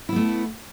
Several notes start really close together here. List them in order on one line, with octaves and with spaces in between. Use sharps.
E4 B3 A3